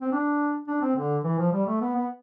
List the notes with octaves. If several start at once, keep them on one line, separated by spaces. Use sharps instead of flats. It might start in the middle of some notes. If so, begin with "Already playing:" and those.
C4
D4
D4
C4
D3
E3
F3
G3
A3
B3
B3